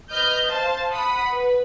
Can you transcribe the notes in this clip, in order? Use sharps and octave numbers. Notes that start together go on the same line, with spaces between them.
B4 D#5 F6 G6
C5 F5 A5
F#5 B5 D#6
B4